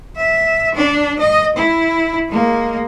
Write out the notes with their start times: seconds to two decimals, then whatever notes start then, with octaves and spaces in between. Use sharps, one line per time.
0.17 E5
0.75 D4
1.20 D#5
1.56 E4
2.28 G#3 A#3